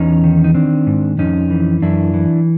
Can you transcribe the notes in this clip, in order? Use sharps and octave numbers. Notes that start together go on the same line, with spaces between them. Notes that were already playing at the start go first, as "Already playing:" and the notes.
Already playing: E2 C#4 D#4
D#3
D#4
D#3 C4 D4
G#2
F2 C#4 D#4
E3
F#2 D4 E4
E3